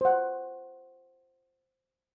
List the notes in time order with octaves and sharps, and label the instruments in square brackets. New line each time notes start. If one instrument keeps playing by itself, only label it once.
[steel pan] C5 F#5